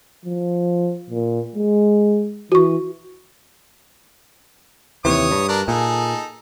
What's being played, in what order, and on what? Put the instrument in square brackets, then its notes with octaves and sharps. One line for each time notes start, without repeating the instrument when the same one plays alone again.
[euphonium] F3
A#2
G#3
[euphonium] E3 [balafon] F#4 C#6
[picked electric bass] D#2 C3 E3 [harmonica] C#5 D#6
[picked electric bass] G2
[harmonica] D4 A#4
[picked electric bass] A#2 [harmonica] D#4 G#4 A4